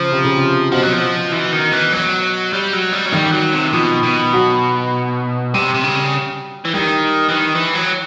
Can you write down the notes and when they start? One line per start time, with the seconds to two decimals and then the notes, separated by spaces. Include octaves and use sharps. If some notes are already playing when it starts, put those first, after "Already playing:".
Already playing: C#3 F3
0.12 C3
0.24 C#3
0.36 C3
0.72 B2 F3
0.83 F#3
0.93 F3
1.32 E3
1.52 D#3
1.72 E3
1.92 F#3
2.53 G3
2.73 F#3
2.93 G3
3.06 F#3
3.12 D#3 G3
3.33 F#3
3.53 C3
3.73 B2 F3
4.03 B2
4.33 F#3
5.54 C3 G3
5.75 C3
5.84 C#3
6.65 E3
6.74 D#3 G3
7.28 E3
7.35 D#3
7.55 E3
7.75 F#3